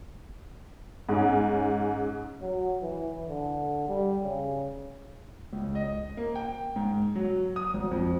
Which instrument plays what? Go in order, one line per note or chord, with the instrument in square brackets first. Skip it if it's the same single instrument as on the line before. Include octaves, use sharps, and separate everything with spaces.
[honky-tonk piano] G#2 C#4
[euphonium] F#3
E3
D3
G3
C#3
[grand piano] C#2
D#5
A#3
G5
G#2
F#3
D#6
G#1
F2